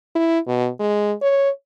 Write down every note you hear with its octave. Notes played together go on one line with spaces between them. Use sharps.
E4
B2
G#3
C#5